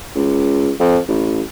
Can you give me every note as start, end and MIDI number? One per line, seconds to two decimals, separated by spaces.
0.16 0.71 37
0.80 0.98 41
1.09 1.42 33